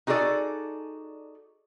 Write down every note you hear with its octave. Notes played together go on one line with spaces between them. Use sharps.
D#4 F#4 G#4 A4 D5